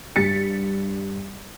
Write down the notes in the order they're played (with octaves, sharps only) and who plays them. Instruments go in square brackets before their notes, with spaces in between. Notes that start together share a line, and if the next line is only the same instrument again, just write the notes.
[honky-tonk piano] G2 A6 B6 C#7